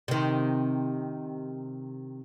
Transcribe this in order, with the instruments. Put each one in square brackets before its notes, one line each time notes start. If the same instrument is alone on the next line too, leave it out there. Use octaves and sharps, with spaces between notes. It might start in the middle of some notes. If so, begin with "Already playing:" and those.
[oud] C3 D#3